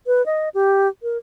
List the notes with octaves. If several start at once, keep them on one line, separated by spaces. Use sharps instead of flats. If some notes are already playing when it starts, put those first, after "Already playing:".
B4
D#5
G4
A#4